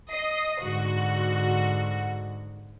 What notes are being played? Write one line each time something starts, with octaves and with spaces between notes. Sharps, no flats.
D#5 C7
G#2 D3 F#4